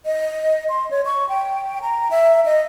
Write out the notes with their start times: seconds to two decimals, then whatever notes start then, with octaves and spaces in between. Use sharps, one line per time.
0.05 D#5
0.69 C6
0.91 C#5
1.05 C#6
1.29 G5
1.82 A#5
2.11 E5
2.46 D#5